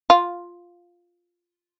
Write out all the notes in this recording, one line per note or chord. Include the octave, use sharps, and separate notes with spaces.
F4